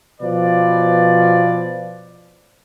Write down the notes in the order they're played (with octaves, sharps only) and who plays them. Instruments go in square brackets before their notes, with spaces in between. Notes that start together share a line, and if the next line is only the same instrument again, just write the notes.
[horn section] B2 F3 B4 D5